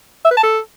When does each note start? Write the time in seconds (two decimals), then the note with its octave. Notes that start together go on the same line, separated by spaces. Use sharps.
0.25 E5
0.31 B4
0.37 A5
0.43 A4